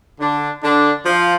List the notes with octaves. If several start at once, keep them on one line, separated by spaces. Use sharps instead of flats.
D3 D4
D3 D4
F3 F4